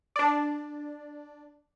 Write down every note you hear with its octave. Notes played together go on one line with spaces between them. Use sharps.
D4 D5